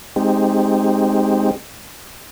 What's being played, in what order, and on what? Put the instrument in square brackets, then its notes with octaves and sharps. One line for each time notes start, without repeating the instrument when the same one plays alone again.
[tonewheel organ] G#3 C4 D#4 G4